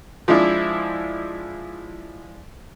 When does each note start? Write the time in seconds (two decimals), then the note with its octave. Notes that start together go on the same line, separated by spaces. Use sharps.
0.28 F3 G#3 D4 E4